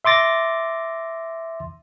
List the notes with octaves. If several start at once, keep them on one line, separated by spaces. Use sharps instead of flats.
E5 C6 D6 A6 A#6